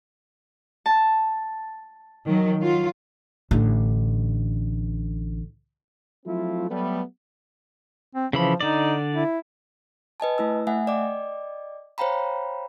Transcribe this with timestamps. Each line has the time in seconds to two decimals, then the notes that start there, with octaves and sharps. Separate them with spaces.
0.86 A5
2.25 D#3 F#3
2.60 F#3 F4
3.51 A1 D3
6.26 F3 F#3 A3 C4 E4 F4
6.70 F#3 G3 A3 B3
8.15 C4
8.33 C#3 E3 F3 B5
8.61 D3 D#4 D5
9.14 E4
10.20 B4 D#5 G#5 A5
10.38 A3 E4 E6
10.67 A3 E5 F#5 G#5
10.87 D5 D#5 G5 D6
11.98 C5 C#5 F5 G5 A#5 B5